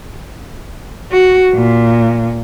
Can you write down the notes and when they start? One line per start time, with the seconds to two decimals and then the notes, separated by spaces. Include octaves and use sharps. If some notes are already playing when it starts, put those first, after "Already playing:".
1.12 F#4
1.55 A#2